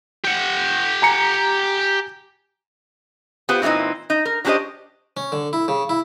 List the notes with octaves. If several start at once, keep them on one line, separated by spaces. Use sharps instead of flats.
G4 F#5
G#5 A#5 C#7
B3 F4 G4 C5
A#2 E3 G#3 C4 D#4
D#4
A#4
F#3 C#4 D4 G4 C5 D#5
C#4
D3
E4
C#3
E4